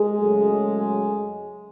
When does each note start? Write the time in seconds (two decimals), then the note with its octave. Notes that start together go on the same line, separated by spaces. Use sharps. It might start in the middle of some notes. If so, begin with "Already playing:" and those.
Already playing: G#3 G#4
0.18 F#2 C#3 F#3 A3